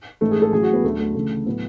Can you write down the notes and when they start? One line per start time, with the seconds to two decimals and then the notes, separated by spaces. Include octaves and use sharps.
0.21 A1 G#2 E3 A3
0.31 G#4
0.42 A4
0.53 A1 A2 F#3 G#4
0.63 F#4
0.73 B3
0.84 D2 D3 F#3 A3
0.99 A3
1.15 D2 C#3 E3
1.46 A2 F#3 B3